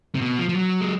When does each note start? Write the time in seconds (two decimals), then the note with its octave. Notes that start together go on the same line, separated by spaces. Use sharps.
0.15 C3
0.21 B2
0.39 F3
0.49 F3
0.56 F#3
0.81 G#3